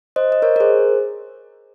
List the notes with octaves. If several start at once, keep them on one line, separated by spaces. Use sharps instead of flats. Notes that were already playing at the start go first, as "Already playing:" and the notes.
C5 D#5
D#5
A#4 C#5
A#4
G#4 C5